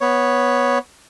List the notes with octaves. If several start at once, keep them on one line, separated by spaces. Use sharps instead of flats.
B3 C#5